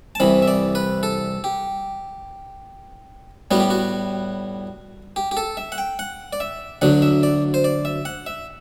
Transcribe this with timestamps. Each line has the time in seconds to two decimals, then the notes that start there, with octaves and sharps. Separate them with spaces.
0.15 A5
0.20 C2 C3 E3 B5
0.42 E5
0.48 D5
0.75 B4
1.03 A4
1.44 G4
3.51 A2 G3 B3 F#4
3.60 G4
3.70 F#4
5.16 G4
5.31 G4
5.37 A4
5.57 E5
5.72 F#5
5.78 G5
5.99 F#5
6.33 D5
6.40 E5
6.81 D2 D3 F#3 F#5
7.02 E5
7.23 D5
7.54 C5
7.64 D5
7.85 E5
8.05 F#5
8.26 E5